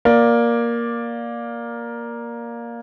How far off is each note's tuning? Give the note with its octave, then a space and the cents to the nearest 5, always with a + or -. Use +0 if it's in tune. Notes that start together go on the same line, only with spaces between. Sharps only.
A#3 +10 D5 +0